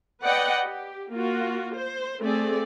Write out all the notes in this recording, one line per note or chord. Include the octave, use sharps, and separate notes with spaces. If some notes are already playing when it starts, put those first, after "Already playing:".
B4 D5 D#5 F#5 G5
G4
A#3 F4 F#4
C5
A3 C4 G#4 D5